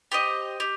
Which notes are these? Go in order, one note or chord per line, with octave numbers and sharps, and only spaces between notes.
G4 C5 D#5
G4